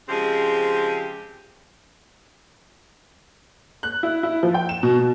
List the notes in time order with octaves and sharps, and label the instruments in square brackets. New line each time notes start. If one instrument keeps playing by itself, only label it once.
[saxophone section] C#3 F3 G#3 C4 G4 G#4
[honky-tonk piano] F#6
E4
E4
F3
G5
E7
B2
B2